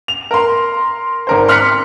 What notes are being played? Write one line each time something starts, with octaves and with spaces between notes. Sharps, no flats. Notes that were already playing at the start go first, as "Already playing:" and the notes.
F7
A#4 C6
G#1 A#4 C5
C6 F6 F#6 B6 C#7